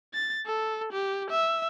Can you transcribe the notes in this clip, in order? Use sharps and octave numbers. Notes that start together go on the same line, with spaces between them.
A6
A4
G4
E5